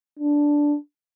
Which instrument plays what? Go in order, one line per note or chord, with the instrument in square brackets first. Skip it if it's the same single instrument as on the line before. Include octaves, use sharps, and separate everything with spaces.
[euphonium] D4